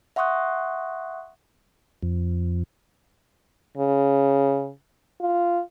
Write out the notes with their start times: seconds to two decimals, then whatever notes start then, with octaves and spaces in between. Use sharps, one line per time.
0.16 E5 F#5 C6 C#6 D#6 F#6
2.03 F2
3.78 C#3
5.21 F4